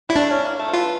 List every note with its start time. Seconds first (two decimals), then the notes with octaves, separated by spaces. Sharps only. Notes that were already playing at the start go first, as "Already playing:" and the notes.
0.09 G3 E4
0.16 A3 D4
0.30 C#4
0.45 A#3
0.59 A3
0.68 F3
0.73 E3 F4